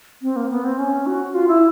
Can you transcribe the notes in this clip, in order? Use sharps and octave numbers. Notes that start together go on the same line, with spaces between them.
C4
A#3
B3
C4
C#4
F#4
F4
E4